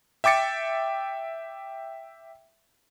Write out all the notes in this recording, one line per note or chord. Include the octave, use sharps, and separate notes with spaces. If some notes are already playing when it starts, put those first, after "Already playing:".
E5 G5 D6 A6 C#7